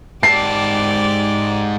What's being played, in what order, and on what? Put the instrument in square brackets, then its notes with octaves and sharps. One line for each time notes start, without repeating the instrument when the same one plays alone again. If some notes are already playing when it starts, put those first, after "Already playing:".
[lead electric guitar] G#2 A5 [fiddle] G4 D5 [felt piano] C7